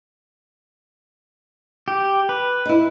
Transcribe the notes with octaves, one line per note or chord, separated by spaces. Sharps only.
G4
B4
D#4 E4